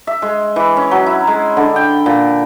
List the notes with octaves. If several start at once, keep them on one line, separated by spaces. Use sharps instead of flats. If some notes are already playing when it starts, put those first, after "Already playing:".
E5
G#3
E3
C#4
F#3
E4
G#3
D3
G5
A#2